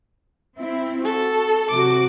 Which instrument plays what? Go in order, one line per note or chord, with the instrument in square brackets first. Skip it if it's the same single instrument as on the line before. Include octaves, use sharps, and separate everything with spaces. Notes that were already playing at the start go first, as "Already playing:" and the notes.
[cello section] C4 E4
[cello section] F#4 [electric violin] A4
[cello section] C3 F#3 F#4 [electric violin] D6